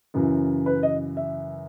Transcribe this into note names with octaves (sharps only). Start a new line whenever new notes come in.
F#2 C#3 E3
B4
D#5
E5